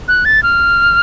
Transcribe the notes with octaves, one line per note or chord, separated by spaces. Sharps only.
F#6
A6
F6